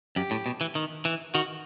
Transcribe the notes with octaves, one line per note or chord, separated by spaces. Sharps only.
F#2 G4
A2
B2
E3
D#3
E3
D#3 F#4